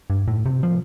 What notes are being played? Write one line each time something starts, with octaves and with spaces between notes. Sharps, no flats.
G2
A2
C3
F3